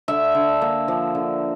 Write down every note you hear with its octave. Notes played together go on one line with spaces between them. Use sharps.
D3 E5
D3
A#3
F3
D3